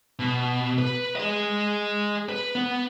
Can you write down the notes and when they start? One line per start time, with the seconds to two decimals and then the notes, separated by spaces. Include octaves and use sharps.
0.19 B2
0.78 B4
1.16 G#4 D#5
2.29 B4
2.55 B3